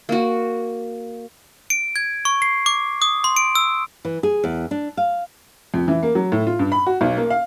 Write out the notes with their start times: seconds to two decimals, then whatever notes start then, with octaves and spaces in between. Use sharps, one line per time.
0.09 A#3 F#4
1.70 D7
1.96 G#6
2.25 C#6
2.42 C7
2.66 D6
3.02 D#6
3.24 C6
3.36 D7
3.55 E6
4.05 E3
4.23 G#4
4.44 E2
4.71 D4
4.97 F5
5.74 F2
5.88 E3
6.03 A#3
6.15 F#3
6.32 A2
6.47 F4
6.59 G2
6.72 B5
6.86 F#4
7.01 B1
7.17 A#3
7.30 F5